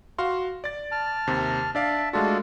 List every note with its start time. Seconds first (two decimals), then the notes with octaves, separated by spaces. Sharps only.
0.18 F#4 F5 C6
0.64 D5 A6
0.92 A5 F6
1.27 D#2 C3
1.75 D4 D5 E5 F5 A5
2.13 G#3 A3 D4 F4 F#4 A4